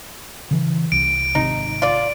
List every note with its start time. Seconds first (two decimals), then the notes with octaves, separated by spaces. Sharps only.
0.51 C#3 E3
0.92 C2 D7
1.35 G#1 C3 D#4
1.82 F4 D5